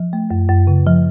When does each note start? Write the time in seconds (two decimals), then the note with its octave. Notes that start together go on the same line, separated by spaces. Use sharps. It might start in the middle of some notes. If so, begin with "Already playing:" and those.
Already playing: F3
0.13 A3
0.31 F#2
0.49 F#2
0.67 C#3
0.86 F3